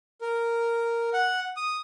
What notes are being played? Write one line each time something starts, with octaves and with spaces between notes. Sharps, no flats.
A#4
F#5
D#6